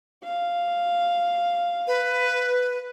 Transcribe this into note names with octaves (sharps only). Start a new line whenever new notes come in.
F5
B4